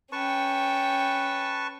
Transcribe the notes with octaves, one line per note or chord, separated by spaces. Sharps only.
C#4 B4 G5 A5 C#6